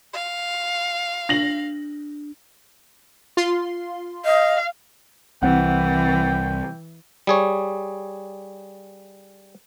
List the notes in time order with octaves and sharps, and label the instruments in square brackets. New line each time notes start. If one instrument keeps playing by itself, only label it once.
[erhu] F5
[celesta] D4 [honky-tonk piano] A#6 F#7
[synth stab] F4 C6
[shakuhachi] D#5 [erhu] F5
[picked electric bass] C2 [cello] E3 [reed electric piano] C4 F#5 [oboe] G5
[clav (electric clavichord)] G3 G#4 C#5